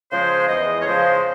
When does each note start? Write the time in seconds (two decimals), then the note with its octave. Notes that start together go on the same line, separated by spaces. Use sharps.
0.11 C#3 F3 G#3 C5
0.48 E2 D#5
0.81 C#5
0.86 C#3 F3 G#3 C5